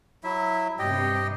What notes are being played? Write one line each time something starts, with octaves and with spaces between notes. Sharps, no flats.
F#3 E4 E5
G2 C3 G4 D#5 G5